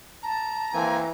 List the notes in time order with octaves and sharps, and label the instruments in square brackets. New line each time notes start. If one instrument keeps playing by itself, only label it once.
[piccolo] A5 [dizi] A#5
[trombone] E3 [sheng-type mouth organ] A#3 C4 G#5